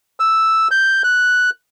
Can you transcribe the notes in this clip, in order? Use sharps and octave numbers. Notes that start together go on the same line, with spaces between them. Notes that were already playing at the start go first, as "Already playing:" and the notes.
E6
G6
F#6